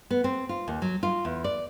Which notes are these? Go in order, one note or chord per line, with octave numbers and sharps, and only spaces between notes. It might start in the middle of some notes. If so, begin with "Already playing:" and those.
B3
C4
F4
D#2
F#3
F4
E2
D5